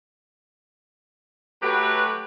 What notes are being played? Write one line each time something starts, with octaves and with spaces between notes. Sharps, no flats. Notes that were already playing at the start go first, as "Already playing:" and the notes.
F#3 A3 F#4 G4 B4